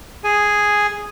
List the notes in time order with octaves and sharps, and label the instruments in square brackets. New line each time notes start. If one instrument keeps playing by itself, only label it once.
[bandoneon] G#4 G#5